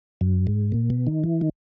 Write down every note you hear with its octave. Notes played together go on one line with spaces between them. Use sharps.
F#2
G#2
A#2
B2
D#3
E3
D#3